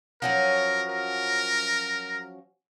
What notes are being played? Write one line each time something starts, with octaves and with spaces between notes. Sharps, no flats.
F3 F#3 C#4 A#4
A#4